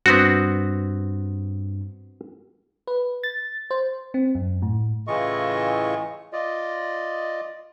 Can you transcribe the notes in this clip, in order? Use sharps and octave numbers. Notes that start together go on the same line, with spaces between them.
G2 B3 C4 F#4
B4
A6
C5
C4
F#2
A2
A2 C#3 E3 F4 D#5 C#6
F4 D5 D#5